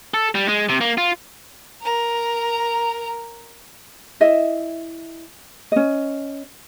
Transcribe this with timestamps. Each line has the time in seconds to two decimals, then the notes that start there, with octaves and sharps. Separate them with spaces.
0.14 A4
0.35 G3
0.48 G#3
0.69 C3
0.81 A#3
0.98 F4
1.82 A#4 A#5
4.20 E4 D#5 E5
5.72 C#4 D#5